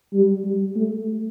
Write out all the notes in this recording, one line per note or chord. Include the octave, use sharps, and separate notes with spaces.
G3
G3
A3